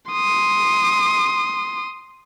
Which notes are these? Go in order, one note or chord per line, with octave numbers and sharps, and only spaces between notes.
C6 D#6